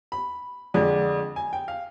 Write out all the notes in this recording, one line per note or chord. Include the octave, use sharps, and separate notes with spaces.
B5
F2 D3 G#3 D4
G#5
G5
F5